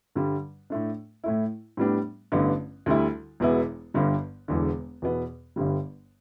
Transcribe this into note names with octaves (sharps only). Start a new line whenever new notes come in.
G2 D3 G3
A2 A3 D4
A2 A3 E4
A2 G3 B3 D4
A1 G2 D3 B3
D2 D3 G3 E4
E1 E2 B2 B3 E4
G1 G2 D3 G3
E1 E2 D3
E2 B2 B3
G1 G2 D3 G3